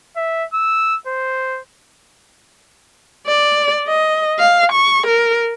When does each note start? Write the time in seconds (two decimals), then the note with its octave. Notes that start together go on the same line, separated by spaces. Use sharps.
0.17 E5
0.54 E6
1.07 C5
3.27 D5
3.88 D#5
4.39 F5
4.72 C#6
5.07 A#4